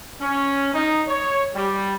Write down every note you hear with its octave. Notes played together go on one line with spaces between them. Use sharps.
C#4
D#4
C#5
G3